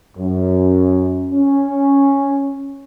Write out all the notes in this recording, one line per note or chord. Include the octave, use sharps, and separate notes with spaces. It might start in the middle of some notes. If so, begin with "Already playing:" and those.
F#2
C#4